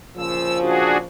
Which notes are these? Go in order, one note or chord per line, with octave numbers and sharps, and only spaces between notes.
A#2 C#3 F3 E6
D4 F#4 G#4